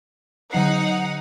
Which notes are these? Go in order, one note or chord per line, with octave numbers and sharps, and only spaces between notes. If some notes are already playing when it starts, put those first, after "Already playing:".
D3 F#3 D#4 F#5 C7